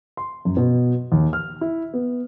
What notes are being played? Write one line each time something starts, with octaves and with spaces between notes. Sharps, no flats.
C6
F#2
B2
D#2
F6
E4
B3